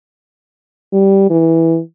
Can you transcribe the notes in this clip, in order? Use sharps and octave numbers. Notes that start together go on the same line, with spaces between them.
G3
E3